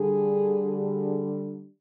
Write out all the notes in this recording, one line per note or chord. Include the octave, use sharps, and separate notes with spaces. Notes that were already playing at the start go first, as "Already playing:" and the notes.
Already playing: D3 G3 G#4
G#4